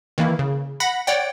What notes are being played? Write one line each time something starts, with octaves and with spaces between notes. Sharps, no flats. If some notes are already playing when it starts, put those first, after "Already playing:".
D#3 E3 A#3 E4
C#3
F#5 B5 A#6 B6
C#5 D5 F#5 G5